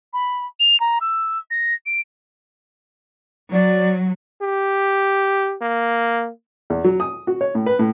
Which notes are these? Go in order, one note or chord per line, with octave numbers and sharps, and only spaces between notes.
B5
F7
A#5
E6
A#6
D7
F#3 D5
G4
A#3
E2
F#3
D#6
F#4
C#5
A2
B4
A2